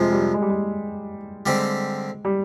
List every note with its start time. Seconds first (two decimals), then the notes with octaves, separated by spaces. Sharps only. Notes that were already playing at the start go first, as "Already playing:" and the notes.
Already playing: F2 C3 F3 G3 G#3
0.12 G3
0.34 G#3
0.42 G3
0.50 G#3
1.46 D3 G3 G#3 C4 G4
2.25 G3